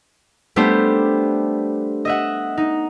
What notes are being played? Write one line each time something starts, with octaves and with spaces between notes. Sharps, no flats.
G3 A3 B3 D4 G4 C5
D#5 E5 F#5
D#4